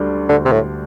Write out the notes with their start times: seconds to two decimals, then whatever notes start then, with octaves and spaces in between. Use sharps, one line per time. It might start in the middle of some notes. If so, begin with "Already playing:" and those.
Already playing: D2 D3 G3 D4
0.29 D2 D3
0.45 C3
0.52 A2